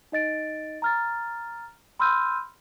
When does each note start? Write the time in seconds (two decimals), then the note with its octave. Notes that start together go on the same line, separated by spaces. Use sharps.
0.12 D#4 D#5 A6 D7
0.82 A#5 F6 A6
1.99 B5 C6 E6 F6 G6 D#7